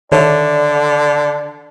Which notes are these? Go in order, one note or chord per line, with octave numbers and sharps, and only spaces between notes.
D3 D#3 A4 C#5 D5 E5